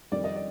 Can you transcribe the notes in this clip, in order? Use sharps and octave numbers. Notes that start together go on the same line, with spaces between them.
F2 D#3 G3 D5
D#5
D5